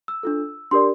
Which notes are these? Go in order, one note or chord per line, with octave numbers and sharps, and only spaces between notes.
E6
D4 F4 A4
D4 G4 A#4 D5 C6